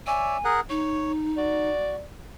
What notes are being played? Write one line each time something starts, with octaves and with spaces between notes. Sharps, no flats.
C#5 D5 E5 G#5
G#4 A#4 F#5
D#4 C#5
F#4 D5